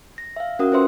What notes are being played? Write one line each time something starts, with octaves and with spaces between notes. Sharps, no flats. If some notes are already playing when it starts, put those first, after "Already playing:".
A#6
E5 F5
C#4 F#4 A#4 F#5 D#6
C#4 F4 B4 C5 E5 C6